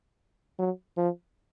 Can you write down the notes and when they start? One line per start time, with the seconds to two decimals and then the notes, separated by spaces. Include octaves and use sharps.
0.59 F#3
0.97 F3